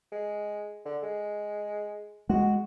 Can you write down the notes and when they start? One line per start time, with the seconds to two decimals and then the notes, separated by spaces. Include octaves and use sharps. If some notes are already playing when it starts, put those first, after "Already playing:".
0.12 G#3
0.86 D3
1.03 G#3
2.29 G#3 F#4